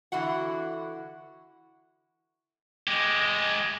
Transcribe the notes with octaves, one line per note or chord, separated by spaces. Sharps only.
D3 E3 E4 F#4 F#5
G#3 G4